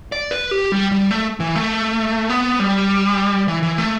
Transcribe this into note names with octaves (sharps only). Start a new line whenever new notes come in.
D5
B4
G4
G3
G3
A3
E3
A3
B3
G3
E3
E3
A3